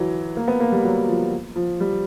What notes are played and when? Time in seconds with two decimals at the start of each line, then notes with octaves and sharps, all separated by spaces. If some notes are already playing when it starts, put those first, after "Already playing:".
Already playing: E3 F#3
0.37 A#3
0.48 B3
0.60 A#3
0.72 G3
0.84 F#3
1.08 F3
1.56 F3
1.80 G3